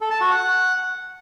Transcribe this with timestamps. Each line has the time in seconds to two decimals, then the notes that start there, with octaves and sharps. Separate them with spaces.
0.01 A4
0.11 A5
0.21 F#4
0.31 F#5